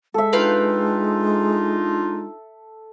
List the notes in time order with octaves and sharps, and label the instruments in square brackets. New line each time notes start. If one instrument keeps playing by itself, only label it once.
[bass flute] G#3 [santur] A4 E5
[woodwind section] D4 D#4 F4 [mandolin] B4 F5 G5